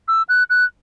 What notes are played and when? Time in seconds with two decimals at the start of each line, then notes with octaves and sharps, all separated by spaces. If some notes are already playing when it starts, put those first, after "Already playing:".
0.08 E6
0.29 F#6
0.50 F#6